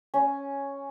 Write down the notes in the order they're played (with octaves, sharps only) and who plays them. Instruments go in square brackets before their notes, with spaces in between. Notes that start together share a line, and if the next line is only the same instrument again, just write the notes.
[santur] C#4